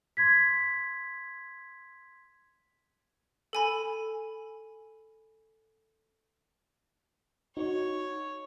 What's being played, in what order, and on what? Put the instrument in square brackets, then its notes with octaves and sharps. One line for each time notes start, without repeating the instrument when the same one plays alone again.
[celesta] C6 G#6 B6
[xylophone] A4 G#5 B5
[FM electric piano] D#4 F#4 [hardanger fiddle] C#5